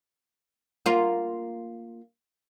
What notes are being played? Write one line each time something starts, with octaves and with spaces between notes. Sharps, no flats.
A#3 F4